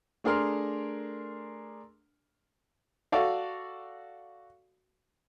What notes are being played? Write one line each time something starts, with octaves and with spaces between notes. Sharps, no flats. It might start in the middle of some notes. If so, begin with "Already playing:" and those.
A3 D4 G#4 A#4 C6 F6
F#4 A4 D5 F5